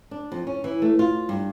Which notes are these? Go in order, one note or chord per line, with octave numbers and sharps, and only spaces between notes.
D4
F2
C#4
E3
A3
F4
G2